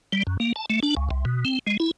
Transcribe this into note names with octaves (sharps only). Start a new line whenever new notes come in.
G3
F#2
A#3
A5
A3
D4
C#2
C2
B2
C4
G#3
E4